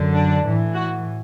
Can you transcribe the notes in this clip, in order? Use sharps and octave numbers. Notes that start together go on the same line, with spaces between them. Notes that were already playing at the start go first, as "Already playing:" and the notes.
Already playing: F#2 D3
D4
A2 E3
F#4